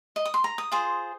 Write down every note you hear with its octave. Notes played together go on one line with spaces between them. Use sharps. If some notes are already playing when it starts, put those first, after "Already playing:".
D#5
D#6
C6
A#5
D#6
F4 G#4 C5